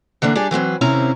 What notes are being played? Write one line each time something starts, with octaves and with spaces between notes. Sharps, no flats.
D3 E3 A#3 D4
G3 D4 G4 G#4 D5
E3 F#3 C4 B4
D#2 C3 C4 C#4 E4 A#5